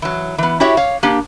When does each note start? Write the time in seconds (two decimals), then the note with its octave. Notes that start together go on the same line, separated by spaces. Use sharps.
0.02 E3 F#3
0.38 E3 B3
0.60 E4 F#4 G4 C#5 E5
0.77 C#5 F5
1.03 A#3 D4 G4